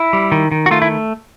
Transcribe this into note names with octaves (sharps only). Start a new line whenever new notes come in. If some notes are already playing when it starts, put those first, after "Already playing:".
Already playing: E4
G3
D#3
D#3
F#4
A3 F4
E4